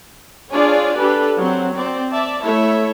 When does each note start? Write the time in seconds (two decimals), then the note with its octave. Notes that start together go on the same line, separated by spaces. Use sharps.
0.52 D4 F4 G#4 C#5 D5 G#5
0.97 D4 G4 A4 B4
1.37 F#3 C4
1.74 C4 D5
2.10 D5 E5 A5
2.44 A3 E4 C#5 E5